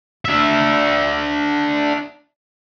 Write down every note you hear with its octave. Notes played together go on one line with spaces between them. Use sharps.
D4 E5